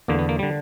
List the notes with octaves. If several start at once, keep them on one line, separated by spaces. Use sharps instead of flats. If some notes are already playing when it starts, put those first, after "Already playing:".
E2 D3 A#3
B3
A#3
D3 G3